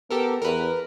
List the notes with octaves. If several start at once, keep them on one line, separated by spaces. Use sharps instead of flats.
B3 G4 A4 A#4
E2 A#4 B4